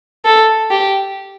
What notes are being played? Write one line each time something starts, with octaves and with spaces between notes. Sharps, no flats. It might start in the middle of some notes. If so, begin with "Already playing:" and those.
A4
G4